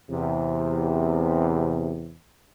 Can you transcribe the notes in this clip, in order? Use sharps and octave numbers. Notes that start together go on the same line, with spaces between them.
E2 C3